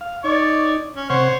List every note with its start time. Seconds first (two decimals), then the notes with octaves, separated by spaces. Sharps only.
0.01 F5
0.24 D#4 C#5 D5
0.95 C#4
1.10 C3 C5 C#5 F#5 C#6